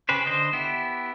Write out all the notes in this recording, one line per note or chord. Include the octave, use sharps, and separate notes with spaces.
C#3 C#4 G4 B4 C5
D3 C5 D#5
B3 E4 G4